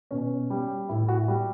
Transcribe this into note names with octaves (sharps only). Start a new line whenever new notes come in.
B2 C#4
G3
A2 E4
F#4
G3 G4